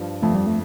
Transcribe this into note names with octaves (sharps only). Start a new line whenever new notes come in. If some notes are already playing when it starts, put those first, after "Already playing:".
Already playing: G2 F3
F2 A3
G3
A3